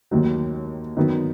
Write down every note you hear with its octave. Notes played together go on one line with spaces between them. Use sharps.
D#2 D#3 F#3
D#3 F#3 B3 D#4